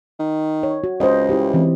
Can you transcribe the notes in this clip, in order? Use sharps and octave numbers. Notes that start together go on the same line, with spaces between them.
D#3
C#5
F#4
C#2 C5 D#5
E4 G4
E3 C4